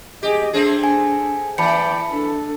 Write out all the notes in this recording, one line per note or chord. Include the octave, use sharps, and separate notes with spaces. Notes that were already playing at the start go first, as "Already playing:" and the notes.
G4 G#4 D#5
A3 C4 D4 G#4
G#5
E3 D5 G5 A5 B5 C#7
D4 A4